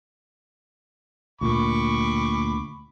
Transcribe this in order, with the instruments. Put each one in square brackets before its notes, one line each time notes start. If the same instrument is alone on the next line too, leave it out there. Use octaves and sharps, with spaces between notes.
[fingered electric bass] D2 A#2 [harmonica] B5 C#6 D6